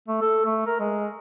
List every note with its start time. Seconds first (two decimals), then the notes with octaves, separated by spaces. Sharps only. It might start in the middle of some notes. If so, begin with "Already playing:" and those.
0.08 A3
0.21 A4
0.46 A3
0.66 A#4
0.80 G#3